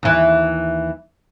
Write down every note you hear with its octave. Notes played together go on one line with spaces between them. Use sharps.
D#2 E3